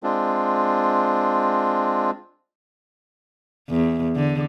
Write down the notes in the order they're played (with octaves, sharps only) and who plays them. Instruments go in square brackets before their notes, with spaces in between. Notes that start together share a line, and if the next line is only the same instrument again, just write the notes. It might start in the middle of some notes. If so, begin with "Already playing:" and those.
[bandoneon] G#3 C4 D4 F4
[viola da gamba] E2
D3